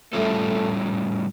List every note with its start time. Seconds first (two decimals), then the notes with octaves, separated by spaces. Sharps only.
0.13 A2 G3 A3 C#4 F4 A4